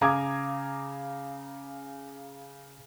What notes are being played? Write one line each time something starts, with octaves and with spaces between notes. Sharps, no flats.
C#3 F5 A#5 D6 D#6 G#6